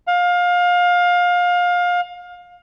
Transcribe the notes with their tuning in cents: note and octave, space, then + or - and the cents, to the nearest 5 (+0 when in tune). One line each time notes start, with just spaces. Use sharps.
F5 +25